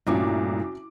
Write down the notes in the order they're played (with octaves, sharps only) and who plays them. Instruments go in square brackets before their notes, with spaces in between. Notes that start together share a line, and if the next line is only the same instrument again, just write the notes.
[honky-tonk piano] C2 E3 D6 [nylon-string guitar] G2 A#2 A3 [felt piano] C#4 F#4